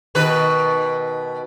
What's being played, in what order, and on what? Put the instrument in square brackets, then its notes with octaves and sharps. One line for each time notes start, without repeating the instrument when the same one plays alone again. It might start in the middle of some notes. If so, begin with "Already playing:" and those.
[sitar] B2 D#3 B4